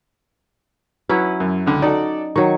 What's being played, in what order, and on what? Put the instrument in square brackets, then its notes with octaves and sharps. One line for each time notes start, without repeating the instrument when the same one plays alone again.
[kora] F#3 C#4 E4 [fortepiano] B4
[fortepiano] F#2
C#2 D3
[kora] D#4 [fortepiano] F#4 A4 D5
[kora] D#3 F#3 [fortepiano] C#6